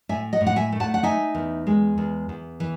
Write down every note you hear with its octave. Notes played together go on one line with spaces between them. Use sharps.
A2 E5 G#5
D#5 F#5
A2
F#5
E5 G#5
A3
F#5 A5
F#5
D#4 E5 G#5
E2
G#3
E2
E2
E3